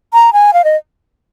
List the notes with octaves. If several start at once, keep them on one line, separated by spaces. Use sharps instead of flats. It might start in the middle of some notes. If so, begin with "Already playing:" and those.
A#5
G#5
F5
D#5